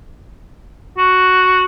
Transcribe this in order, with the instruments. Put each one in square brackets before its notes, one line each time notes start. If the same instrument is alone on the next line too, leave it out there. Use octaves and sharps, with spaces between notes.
[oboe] F#4